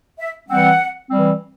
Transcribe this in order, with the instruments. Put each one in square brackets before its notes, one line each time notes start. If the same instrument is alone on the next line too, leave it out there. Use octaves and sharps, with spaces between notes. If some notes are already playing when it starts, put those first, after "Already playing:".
[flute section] E5
[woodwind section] E3 G3 C4 [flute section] F#5
[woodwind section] E3 G3 C4